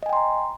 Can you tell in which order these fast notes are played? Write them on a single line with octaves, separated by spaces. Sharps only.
D#5 G#5 G5 C6 A#5